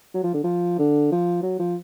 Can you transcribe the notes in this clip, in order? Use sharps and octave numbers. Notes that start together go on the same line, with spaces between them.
F#3
F3
D3
F3
D3
F3
F#3
F3